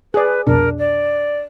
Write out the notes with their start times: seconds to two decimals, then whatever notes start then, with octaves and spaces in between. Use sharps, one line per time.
0.14 G#4 B4 D5 F#6
0.47 C2 F2 B2 D4 A#4
0.79 D5